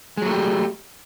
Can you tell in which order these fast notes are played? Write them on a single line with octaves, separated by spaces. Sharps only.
G#3 F#3 A3 G4